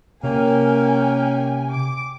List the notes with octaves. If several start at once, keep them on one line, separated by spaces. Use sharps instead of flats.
C3 A#3 C#4 G5 G#5
D6